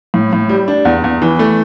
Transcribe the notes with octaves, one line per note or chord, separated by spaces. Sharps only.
A2
A2
G3
D4
E2
E2
E3
A3